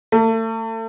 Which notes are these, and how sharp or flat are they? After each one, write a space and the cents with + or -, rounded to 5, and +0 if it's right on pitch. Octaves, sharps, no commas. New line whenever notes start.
A3 +35